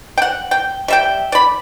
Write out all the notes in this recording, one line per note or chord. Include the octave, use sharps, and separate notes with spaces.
F#5 G5
G5
G3 E5 G5
D5 B5